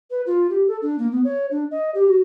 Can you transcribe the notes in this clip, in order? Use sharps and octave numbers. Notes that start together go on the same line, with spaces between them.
B4
F4
G4
A4
D4
A#3
B3
C#5
D4
D#5
G4
F#4